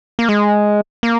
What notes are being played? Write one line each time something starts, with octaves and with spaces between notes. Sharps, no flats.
A#3
G#3
A#3